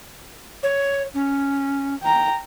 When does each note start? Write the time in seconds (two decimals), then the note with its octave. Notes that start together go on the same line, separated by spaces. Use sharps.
0.63 C#5
1.14 C#4
2.02 G5 A#5